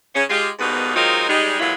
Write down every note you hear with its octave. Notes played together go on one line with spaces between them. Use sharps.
C#3 C#4
G#3 F4 G4
G#2 B2 G3 A#3 B3 D#4
F#3 G#3 C4 D#4 F4 A#4
G3 G#3 D#4
D#2 E3 F#3 G#3 E4 F4